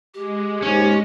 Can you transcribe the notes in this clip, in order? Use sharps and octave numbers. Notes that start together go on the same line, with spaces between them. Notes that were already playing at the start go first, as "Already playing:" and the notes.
G#3 G4
D#2 G#2 C#4